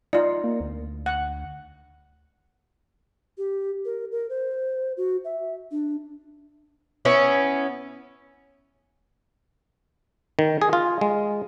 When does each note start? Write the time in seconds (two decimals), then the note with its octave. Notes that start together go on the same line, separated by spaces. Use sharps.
0.13 D#4 F4 D5
0.44 A#3
0.60 D2
1.06 F#5
3.38 G4
3.85 A#4
4.12 A#4
4.30 C5
4.97 F#4
5.25 E5
5.71 D4
7.05 B3 C#4 E4
10.39 D#3
10.62 G#4
10.73 F4
11.01 G#3